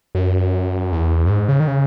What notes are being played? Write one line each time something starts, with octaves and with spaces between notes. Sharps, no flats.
F#2
E2
F#2
G#2
C#3
D#3
C#3